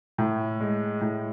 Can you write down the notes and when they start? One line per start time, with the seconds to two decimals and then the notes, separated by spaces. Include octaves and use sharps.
0.18 A2
0.60 G#3
1.01 A2